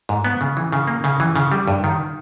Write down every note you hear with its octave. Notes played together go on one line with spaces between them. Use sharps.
G#2
B3
C#3
E3
C#3
A#3
C#3
E3
C#3
G3
G2
D#3